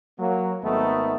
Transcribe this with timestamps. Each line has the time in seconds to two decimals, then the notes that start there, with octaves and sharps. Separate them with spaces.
0.18 F#3 A#3
0.63 G#1 D#3 A3 B3 D#4 A4